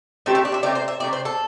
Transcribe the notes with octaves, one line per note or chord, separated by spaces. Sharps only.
A3 C4 G4 A4 C5
E4
D4
E5
C3 A3 C4 D5
C5
E5
C3 A3 C4 D5
C5
A4